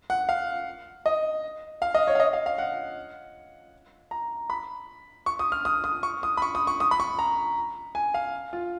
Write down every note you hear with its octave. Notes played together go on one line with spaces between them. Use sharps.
F#5
F5
D#5
F5
D#5
C#5
F5
D#5
F5
F5
F#5
A#5
B5
C#6
D#6
F6
D#6
D#6
C#6
D#6
B5
C#6
D#6
C#6
D#6
B5
C#6
A#5
G#5
F5
F4